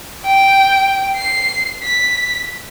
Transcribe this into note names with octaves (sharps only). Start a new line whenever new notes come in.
G5
C7
B6